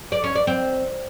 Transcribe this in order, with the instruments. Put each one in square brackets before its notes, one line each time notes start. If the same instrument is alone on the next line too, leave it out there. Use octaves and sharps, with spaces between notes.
[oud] D5
C#4
D5
C4